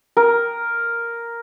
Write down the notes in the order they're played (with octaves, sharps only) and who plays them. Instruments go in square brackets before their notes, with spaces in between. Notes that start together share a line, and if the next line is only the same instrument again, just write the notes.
[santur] A#4